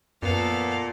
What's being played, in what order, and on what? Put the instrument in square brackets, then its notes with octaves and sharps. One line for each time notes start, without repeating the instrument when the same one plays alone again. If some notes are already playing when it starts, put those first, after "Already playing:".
[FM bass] F#2 [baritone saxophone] A#2 [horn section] F3 A#3 B3 [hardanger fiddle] A4 F5